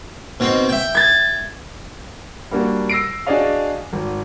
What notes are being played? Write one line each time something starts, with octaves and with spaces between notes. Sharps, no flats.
B2 D#3 C4
E5 G5
G#6 A6
G3 A#3 D4 F#4
E6 A#6 C7 D7
D4 F#4 G#4 D5 D#5 F5
G#1